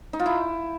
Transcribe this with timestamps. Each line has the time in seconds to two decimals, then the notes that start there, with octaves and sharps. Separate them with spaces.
0.13 D#4
0.19 F4
0.26 E4